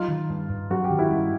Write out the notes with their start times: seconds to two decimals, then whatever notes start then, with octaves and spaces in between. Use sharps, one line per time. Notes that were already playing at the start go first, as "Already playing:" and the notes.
Already playing: F#3 D#4 F4
0.08 D#3
0.30 G2
0.50 G2
0.70 F#3 F#4
0.84 G4
0.90 D#3
0.99 E4 F#4
1.11 G2